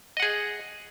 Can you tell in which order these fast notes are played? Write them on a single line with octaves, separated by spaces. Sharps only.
D#5 F#5 G#4